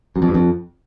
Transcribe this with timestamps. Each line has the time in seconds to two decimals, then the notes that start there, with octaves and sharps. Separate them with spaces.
0.16 F#2
0.22 F2
0.28 G2
0.34 F2